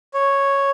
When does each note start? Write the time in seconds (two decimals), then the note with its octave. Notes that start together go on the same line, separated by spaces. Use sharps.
0.14 C#5